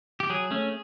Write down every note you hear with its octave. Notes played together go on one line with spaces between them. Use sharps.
G4
F#3 G#4
A3 C#4